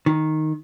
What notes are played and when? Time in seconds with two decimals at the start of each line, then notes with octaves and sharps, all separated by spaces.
0.06 D#3